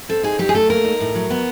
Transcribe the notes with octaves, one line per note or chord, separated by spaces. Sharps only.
C4 A4
D#4 G#4
F#3 G4
G#4
A3 A4
A#3 A#4
D#4
A2
F#3
B3